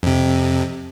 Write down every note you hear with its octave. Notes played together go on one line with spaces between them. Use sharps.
F2 C3